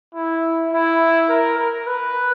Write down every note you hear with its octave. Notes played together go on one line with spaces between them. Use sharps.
E4
E4
A#4
A#4
B4